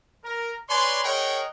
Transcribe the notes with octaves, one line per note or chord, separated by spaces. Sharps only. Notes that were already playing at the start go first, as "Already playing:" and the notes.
A#4
B4 C#5 D5 G#5 C6
G#4 A#4 C#5 D#5 F#5 G5